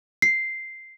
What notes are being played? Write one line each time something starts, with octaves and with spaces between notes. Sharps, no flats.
C7